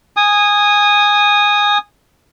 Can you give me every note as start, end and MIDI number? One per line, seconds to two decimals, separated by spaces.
0.17 1.78 80
0.17 1.78 87